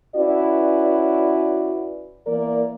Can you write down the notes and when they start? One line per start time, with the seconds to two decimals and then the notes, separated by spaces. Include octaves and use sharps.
0.16 C#4 E4 F#4 B4 D5
2.27 E3 A#3 A#4 D5